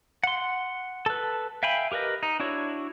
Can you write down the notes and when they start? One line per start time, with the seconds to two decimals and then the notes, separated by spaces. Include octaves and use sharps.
0.24 F#5 C6
1.06 A4 B4
1.63 E5 F5 G5 G#5 B5
1.92 G4 A#4 B4 D#5
2.23 D#4
2.40 D4 E4 F#4 C#5